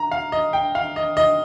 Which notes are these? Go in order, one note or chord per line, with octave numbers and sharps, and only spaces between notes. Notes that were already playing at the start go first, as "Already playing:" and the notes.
Already playing: A#5
F5
D#5
G5
F5
D#5
D#5